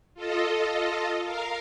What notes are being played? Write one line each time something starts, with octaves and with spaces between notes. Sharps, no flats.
F4 A4 D#5
A#4 F5